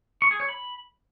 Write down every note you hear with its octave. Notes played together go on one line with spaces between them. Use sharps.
C#6
G#4
C#5
B5